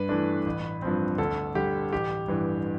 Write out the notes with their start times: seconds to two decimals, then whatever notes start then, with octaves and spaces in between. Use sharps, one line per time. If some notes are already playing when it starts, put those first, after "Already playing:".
Already playing: G2 B4
0.09 E3 A3 D4
0.46 A1
0.82 G2 F3 C4
1.18 D2 A4
1.55 D3 G3 G4
1.93 A1 G4
2.28 G2 E3